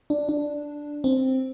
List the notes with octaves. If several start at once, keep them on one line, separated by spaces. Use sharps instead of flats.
D4
D4
C4